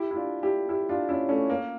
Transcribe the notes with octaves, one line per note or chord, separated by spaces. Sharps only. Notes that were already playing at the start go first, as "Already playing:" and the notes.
Already playing: E4 G4
E4
D4 F4
E4 G4
E4 G4
D4 F4
C#4 E4
A3 C#4
A#3